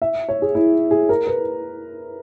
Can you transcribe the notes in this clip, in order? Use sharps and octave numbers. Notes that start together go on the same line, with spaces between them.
E5
C#5
G#4
E4
G#4
A#4
B4